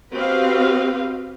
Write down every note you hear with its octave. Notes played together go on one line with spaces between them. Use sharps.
C4 F#4 G4 B4 D#5 F5